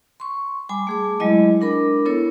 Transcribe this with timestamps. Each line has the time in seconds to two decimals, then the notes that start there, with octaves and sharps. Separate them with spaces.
0.20 C6 C#6
0.69 G3 G#5 B5 D6
0.87 A3 G#4 D6
1.20 F#3 G#3 E4 D#5
1.61 D4 A#4 B5 D6
2.05 B3 E4 A4 C#5